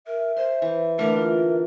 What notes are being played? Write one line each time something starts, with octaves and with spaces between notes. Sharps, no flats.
A#4 E5
C5 C6
E3
D3 E3 A3 A#3 D4 A#4 B4
F4